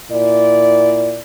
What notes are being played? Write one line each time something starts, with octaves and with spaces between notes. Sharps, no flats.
A#2 E4 D5